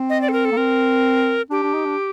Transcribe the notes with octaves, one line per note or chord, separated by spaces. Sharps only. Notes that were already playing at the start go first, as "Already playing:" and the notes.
Already playing: C4
D#5
D5
A4
A#4
A4
A#3
C4 A#4
D4 G4
D4
D#4
D4